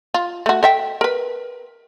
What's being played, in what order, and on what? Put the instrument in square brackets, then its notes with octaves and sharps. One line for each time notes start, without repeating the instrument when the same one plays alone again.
[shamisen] F4
A3 F#4
A4 E5 G5
A#4 B4